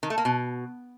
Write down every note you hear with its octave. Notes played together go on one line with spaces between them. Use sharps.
D#3
A3
A#3
B2